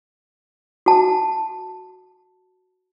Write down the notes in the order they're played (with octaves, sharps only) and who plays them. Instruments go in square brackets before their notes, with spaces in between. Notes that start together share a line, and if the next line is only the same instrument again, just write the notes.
[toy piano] F#4 A5